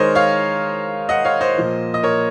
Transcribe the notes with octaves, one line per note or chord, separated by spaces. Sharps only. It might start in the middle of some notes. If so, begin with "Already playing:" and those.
Already playing: D#3 G#3 A#4 C5 C#5 D#5
C#5 F5
D#5 F#5
C#5 F5
C5 D#5
A#2 F3 A#3
D#5
A#4 C#5